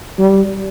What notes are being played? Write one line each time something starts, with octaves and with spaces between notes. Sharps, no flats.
G3